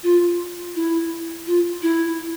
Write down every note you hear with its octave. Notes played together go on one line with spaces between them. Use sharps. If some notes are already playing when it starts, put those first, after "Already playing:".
F4
E4
F4
E4